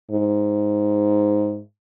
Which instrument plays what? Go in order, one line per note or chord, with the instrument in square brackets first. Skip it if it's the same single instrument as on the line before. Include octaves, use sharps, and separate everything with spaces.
[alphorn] G#2